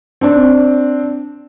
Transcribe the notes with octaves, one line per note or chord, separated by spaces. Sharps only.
C4 D4